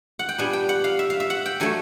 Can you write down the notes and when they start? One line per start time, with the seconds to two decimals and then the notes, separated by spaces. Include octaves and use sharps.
0.19 F#5
0.29 G5
0.38 A#2 G3 B3 D4 G#5
0.53 G5
0.69 F#5
0.84 F5
0.99 E5
1.10 F5
1.20 E5
1.30 F#5
1.46 G5
1.60 D3 F#3 A3 G#5